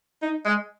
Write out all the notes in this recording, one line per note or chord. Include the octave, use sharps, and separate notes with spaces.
D#4
G#3